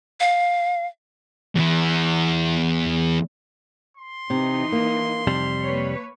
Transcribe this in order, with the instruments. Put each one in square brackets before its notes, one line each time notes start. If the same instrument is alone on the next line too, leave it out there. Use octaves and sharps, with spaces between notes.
[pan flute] F5
[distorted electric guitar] E2 E3
[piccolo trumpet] C6
[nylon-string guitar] C3 [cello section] E3 D#4
[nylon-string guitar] A#3
[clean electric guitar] F2 C3 G3 [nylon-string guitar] A5
[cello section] A#3 B4 C#5